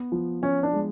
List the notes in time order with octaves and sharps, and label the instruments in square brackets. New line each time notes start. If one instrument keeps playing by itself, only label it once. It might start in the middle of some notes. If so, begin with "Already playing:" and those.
Already playing: [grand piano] B3
F3
[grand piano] F3 [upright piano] C#4
[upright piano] D4
[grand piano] G#3